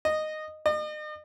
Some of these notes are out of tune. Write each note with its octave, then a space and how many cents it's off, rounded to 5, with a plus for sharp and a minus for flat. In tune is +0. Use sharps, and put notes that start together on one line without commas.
D#5 -10
D#5 -40